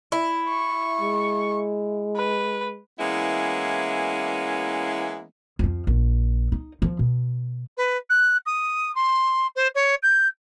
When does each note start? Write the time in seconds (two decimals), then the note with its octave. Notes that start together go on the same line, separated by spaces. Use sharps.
0.12 E4
0.50 C#6
1.01 G#3
2.16 B4
2.99 E3 G#3 A#3 B3 C#4 E4
5.59 F2 F3
5.87 A#1
6.52 D#4
6.82 F3
6.99 B2
7.77 B4
8.10 F#6
8.46 D#6
8.95 C6
9.56 C5
9.75 C#5
10.03 G6